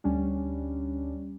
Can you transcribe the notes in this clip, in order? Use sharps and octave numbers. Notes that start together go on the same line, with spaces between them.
D2 G3 C#4 D4